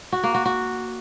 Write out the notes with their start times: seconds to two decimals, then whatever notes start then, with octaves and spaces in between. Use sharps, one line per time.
0.12 F#4
0.24 A#3
0.35 F#4
0.46 F#4